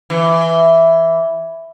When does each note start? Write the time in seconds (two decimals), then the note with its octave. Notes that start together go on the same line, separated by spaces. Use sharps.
0.10 E3